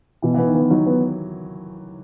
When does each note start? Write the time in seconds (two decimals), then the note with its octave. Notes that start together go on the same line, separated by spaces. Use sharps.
0.22 B2 E3
0.34 E3
0.39 B3
0.47 D#3
0.55 E3 B3
0.70 F#3 D#4
0.86 B3